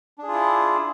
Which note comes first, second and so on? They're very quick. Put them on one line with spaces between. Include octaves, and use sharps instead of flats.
D4 G#4 F4 E4